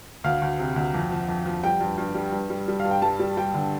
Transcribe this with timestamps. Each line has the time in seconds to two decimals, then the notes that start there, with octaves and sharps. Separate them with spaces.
0.24 D2 F5
0.42 D2
0.59 C3
0.76 D2
0.94 F2
1.11 F3
1.28 F2
1.46 F3
1.63 G3 G5
1.81 G2
1.98 G2
2.15 G3
2.32 G2
2.50 G3
2.68 G3
2.80 G2 F5
2.91 G5
3.02 G3 A5
3.19 G3
3.37 G3 G5
3.54 D3